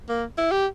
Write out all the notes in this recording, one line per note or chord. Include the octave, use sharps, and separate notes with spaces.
A#3
E4
G4